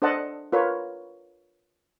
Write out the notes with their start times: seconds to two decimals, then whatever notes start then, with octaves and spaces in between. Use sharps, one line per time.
0.02 D4 A4 C5 D#5 F#5 A5
0.52 F4 A#4 B4 C#5